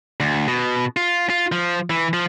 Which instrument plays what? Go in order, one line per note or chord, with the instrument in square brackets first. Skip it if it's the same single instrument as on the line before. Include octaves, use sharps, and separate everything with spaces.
[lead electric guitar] D2
B2
F4
F4
F3
E3
F3